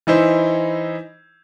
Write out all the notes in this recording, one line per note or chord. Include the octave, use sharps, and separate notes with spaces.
E3 D#4 E4 C5